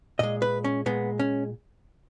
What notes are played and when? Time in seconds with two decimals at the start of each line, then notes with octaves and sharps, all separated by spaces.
0.19 A#2 G#3 D#5
0.42 B4
0.64 C#4
0.86 A#2 G#3 B3
1.19 C#4